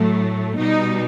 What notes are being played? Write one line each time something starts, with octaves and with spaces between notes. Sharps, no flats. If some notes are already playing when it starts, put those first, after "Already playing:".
Already playing: A2 F#3 A3
B2 G3 D#4